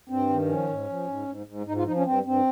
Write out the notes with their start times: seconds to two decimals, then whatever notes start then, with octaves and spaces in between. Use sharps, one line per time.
0.09 G2 C4
0.29 D#3
0.49 F3 C#4
0.68 G#2
0.88 F3
1.08 G#2
1.27 G#2
1.46 G#2
1.66 G#2 D#4
1.76 F4
1.86 F3 D#4
1.96 C#4
2.05 G2 C4
2.25 G2 C4